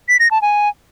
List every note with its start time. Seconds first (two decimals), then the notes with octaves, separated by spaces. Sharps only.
0.09 B6
0.20 A#6
0.31 A5
0.42 G#5